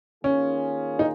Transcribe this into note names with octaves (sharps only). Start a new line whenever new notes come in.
D#3 A#3 C#4 F4 G#4
D#4